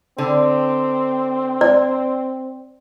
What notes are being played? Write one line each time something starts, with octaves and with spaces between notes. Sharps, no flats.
D3 C4
D5